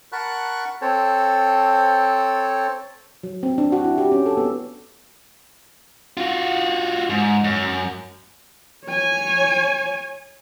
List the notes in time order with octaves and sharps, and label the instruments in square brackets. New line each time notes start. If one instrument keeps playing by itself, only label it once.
[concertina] A#4 F#5 A5 B5 C#6 F#6
C4 A4 C5 C#5 A5
[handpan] F#3
C4
D4
F#4
E4
G4
C#4
A4
B3
[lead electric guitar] F4 F#4
G#2
F#2
[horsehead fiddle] C#5 G#5